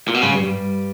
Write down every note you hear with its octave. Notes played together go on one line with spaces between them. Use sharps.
A#2
B2
G#2 C#3 G#3
G2 G3
G2 G3